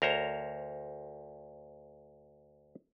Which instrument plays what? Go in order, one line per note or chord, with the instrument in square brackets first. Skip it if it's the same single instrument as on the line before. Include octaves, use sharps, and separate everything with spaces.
[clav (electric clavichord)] D2 A#4 C5 C#5 A#5